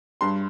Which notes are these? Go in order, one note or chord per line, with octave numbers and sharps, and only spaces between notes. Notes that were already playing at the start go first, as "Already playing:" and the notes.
G2 C6